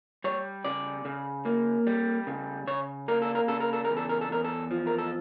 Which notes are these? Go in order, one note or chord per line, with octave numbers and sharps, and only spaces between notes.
G3 C#5
C#3 D5
C#3
A#3
G3
C#3
C#3 C#5
A#3 A#4
A4
A#4
C#3 A4
A#4
A4
A#4
E2
A4
A#4
A4
E2 A#4
A4
F3
A#4
A4